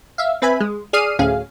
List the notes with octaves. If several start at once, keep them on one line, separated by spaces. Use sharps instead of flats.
E5 F5
C4 B4 E5 G#5 B5
G#3
G#4 D5 D#6 F6 C7 D#7
D2 A2 C#4 G#4 F5